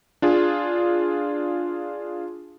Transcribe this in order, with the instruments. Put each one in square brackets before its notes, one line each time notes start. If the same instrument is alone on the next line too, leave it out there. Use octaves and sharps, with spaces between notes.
[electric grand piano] D4 F4 G#4